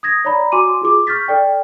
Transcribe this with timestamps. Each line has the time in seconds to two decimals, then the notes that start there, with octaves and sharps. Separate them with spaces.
0.03 D#6 G#6 A#6
0.25 C#5 D5 A#5 B5
0.52 F#4 G#5 C6 D6 D#7
0.82 F4 G#4 D6
1.07 C#6 F6 G6 A6 B6
1.28 A4 D5 G5